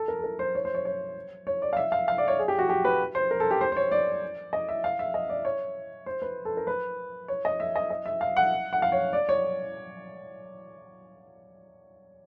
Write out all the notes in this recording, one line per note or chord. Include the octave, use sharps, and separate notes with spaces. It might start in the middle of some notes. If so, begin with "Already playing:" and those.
Already playing: A4
A#4
A4
A#4
C5
C#5
C5
C#5
C#5
C#5
D5
F5
E5
F5
F5
D5
C#5
G#4
G4
F#4
G4
B4
C5
A#4
A4
G4
C5
C5
C#5
D5
D#5
E5
F5
E5
D#5
D5
C#5
C5
B4
A4
A#4
B4
C#5
D#5
E5
D#5
D#5
E5
F5
F#5
F#5
F5
C#5
D5
C#5